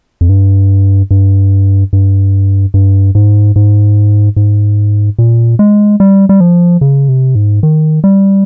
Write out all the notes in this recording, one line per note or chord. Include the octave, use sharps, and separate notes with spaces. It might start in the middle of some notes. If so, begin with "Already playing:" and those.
F2
G2
G2
G2
G2
G#2
G#2
G#2
A#2
G#3
G3
G3
F3
C#3
C3
G#2
D#3
G3